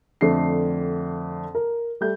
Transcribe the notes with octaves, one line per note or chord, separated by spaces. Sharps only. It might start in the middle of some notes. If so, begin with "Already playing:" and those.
F2 D3 A3 D4 C7
A#4
G3 A3 G6